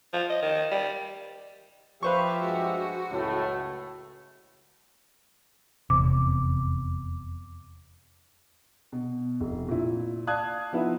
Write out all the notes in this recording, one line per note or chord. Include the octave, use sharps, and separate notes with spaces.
F3
D#5
D#3
G3
F3 G4 B4 C5 E5 F5 C#6
G2 G#3 F#4
C#2 F#2 A2 A3
F1 E2 C3 D6
B2
F1
A#2 E4
D5 F5 A5 D#6 F#6 G#6
F3 B3 D#4 E4 B4 E5